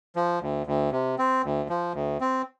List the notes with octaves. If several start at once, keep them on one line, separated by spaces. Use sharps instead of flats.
F3
D2
D2
C3
C4
D2
F3
D2
C4